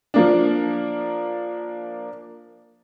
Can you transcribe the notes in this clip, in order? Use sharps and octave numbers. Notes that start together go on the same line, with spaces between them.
F3 A#3 D4